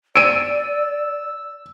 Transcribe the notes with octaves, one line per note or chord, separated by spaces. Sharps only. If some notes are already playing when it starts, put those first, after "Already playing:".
D5 E6 D7 D#7